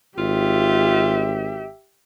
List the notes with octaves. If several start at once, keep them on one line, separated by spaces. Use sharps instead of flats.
G#1 F4 G4 E5